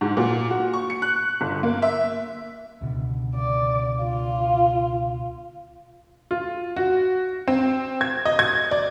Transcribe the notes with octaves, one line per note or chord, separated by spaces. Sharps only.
G#2
A#2
F#4
C#6
C#7
F#6
G1
A#3
E5
C#2 B2 D3
D5
F4
F4
F#4
C4
G#6
D#5
G#6
D5